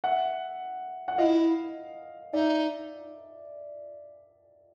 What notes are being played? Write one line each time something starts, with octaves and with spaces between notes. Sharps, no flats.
E5 F#5
F#5
E4 F4 D#5 F5
D#4 D5 E5